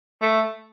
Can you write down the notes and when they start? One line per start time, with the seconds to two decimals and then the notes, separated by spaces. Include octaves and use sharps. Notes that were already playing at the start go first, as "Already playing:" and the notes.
0.22 A3